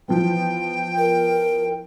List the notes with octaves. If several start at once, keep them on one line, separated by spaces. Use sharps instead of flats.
E3 F3 B3 G5
A#4